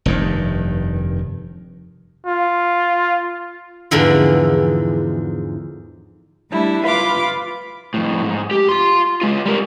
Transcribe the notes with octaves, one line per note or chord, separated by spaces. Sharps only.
F1 G2 D#3
F4
E2 G#2 D3 E3 F3
G3 A3 D4 E4
F4 B4 F5 B5 D6
F2 A2
G#2
G4
F4 C6
G#3 F4
G3 A#4